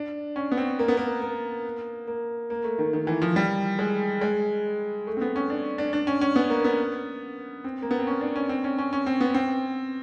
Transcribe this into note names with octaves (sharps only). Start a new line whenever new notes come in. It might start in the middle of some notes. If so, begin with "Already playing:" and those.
Already playing: D4
C#4
B3
C4
A#3
B3
A#3
A#3
A#3
A#3
A3
D#3
D#3
E3
F3
G3
G#3
G#3
A3
C4
B3
C#4
D4
D4
D4
C#4
C#4
B3
A#3
B3
C4
A#3
B3
C4
C#4
D4
C#4
C4
C#4
C#4
C#4
C4
B3
C4